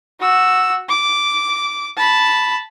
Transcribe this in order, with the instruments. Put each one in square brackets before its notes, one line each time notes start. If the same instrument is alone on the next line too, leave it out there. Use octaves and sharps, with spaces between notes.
[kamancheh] F#4 E6
D6
A5 B5